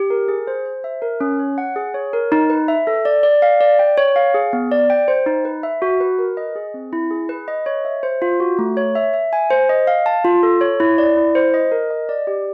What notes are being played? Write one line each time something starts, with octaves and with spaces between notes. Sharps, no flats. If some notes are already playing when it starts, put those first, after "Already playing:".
Already playing: G4
A#4
G#4
C5
C5
E5
A#4
C#4
C#5
F#5
G#4
C#5
A#4
D#4
B4
E5
A4
D5
D5
F5
D5
G5
C#5
F5
G#4
B3
D5
G5
C5
D#4
B4
E5
F#4
B4
A#4
D#5
G#4
C4
E4
G#4
B4
D#5
C#5
E5
C5
F4
F#4
A3
C#5
E5
E5
G#5
C5
D#5
F5
A5
F4
A4
C#5
E4
D5
E4
C5
D#5
A#4
D#5
D5
G4